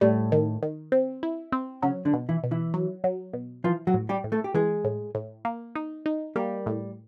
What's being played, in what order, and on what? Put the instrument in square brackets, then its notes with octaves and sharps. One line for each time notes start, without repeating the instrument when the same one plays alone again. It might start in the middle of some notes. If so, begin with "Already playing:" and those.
[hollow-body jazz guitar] A2 A3 [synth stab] G3
[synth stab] D#3
D#3
C4
E4
C4
[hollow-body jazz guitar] C#3 C#4 [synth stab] F#3
[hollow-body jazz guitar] D3 D4
[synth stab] B2
[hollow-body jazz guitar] E3 E4
[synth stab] B2
[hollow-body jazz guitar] E3 E4
[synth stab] F#3
F#3
B2
[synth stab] E3 [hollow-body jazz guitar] F3 F4
[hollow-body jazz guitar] F#3 F#4
[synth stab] A2
[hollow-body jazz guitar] G3 G4
[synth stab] A2
[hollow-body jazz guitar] A3 A4
G4
[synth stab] E3 [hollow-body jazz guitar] G#3 G#4
[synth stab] A2
A2
A#3
D#4
D#4
[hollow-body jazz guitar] G3 G4 [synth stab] A#3
[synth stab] A2